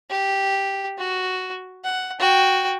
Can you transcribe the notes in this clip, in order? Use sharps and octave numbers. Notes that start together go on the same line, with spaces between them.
G4
F#4
F#5
F#4 G5